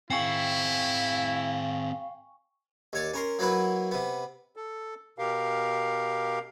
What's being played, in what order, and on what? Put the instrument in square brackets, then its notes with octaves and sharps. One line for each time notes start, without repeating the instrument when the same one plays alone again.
[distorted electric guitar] C4 G#4 [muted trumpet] E4 [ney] F5 [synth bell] G5 G#5 C#6
[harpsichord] D#2 C#5 D5
C#4 A#4 C6
F#3 A#3 B3 E4 B4
C3 B3
[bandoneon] A4
B2 G4 A#4 F5